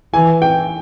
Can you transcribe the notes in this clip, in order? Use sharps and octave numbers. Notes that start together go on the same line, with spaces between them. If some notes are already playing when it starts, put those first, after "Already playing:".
E3 G#5
G5